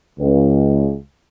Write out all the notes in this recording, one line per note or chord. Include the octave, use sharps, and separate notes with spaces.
C#2